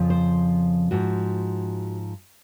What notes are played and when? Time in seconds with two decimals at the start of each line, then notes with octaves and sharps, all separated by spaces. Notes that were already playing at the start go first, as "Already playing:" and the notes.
Already playing: F2 C#3 F3
0.10 C5
0.91 G#2 F3 F#4